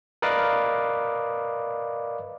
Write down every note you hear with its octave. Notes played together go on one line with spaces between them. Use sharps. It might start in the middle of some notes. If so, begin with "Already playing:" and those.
A#4 B4 D5 D#5 F5 D6